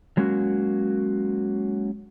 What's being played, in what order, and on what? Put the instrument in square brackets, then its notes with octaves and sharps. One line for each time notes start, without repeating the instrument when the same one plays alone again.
[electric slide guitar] F#3 G#3 A#3 C#4 F#4